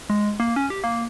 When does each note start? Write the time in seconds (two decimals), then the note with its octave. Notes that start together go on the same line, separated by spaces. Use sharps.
0.10 G#3
0.40 A#3
0.56 C#4
0.70 G4
0.84 A#3